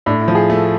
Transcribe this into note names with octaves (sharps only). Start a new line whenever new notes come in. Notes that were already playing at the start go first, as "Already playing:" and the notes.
A2 D4
E4
F3
G#4
A3